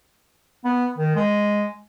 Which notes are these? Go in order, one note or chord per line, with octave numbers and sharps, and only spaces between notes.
B3
D#3
G#3